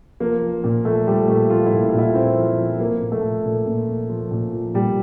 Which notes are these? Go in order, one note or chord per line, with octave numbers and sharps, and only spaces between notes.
F3 A#3
F3
A#2
F3 A3
F3 G3
A#2 A3
F3 F4
E4
A#2
A#2 F4
E4
A#2 C4
F3
F3
F3 A#3
A#2
A3
A#2
A#2
A#2
A#2
F3
A#2
F3
A#2 G3